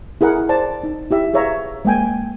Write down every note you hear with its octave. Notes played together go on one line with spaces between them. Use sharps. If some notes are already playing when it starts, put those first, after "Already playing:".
E4 G#4 A#4 F#5
C5 D5 A5
D#4
E4 G4 E5
G#4 B4 C#5 E5 F5 A#5
G#3 A#3 G5 G#5